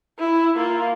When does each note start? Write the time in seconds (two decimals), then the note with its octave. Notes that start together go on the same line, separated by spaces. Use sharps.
0.19 E4
0.56 A#3 F4